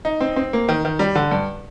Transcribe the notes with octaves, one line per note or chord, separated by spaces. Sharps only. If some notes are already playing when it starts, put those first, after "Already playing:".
D#4
C4
C4
A#3
D#3
D#3
G3
D3
G2